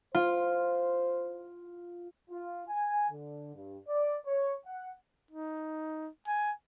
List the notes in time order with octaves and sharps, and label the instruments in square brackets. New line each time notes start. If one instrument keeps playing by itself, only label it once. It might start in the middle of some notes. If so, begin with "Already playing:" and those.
[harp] F4 [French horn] C5
[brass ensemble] F4
G#5
D3
G2
D5
C#5
F#5
[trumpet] D#4
G#5